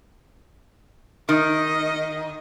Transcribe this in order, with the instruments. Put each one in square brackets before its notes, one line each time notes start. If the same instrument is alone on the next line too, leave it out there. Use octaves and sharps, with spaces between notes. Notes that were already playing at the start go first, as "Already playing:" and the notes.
[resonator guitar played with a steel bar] D#3 [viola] D#5